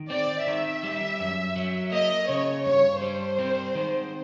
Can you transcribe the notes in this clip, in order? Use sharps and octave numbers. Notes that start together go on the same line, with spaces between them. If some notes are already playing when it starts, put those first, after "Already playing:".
Already playing: D#3
C4 D5
D#3 E5
G3
F#2
F#3
A#3 D#5
C#3 C#5
G2 C#5
G3 C5
C4
D#3